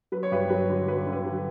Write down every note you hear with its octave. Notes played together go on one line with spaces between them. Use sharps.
F#3 B4
C#5
G2 B4
F#3 B4
D3
F#3 B4
D3
B4
F#3